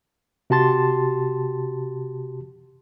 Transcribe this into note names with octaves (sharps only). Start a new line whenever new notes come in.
C3 F#4 G4 A5 C6 A6